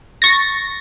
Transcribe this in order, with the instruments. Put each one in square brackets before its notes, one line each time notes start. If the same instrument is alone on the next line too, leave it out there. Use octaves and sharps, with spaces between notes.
[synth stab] C#6 A6 A#6